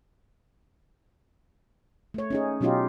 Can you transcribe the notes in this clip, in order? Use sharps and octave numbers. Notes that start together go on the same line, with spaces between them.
A3 C#5
C#4 D#4 G#4
B2 F#3 C#4 D#4 F4 G4